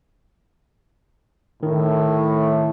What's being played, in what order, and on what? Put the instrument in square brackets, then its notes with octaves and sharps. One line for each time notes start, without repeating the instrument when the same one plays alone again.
[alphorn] A2 [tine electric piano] D#3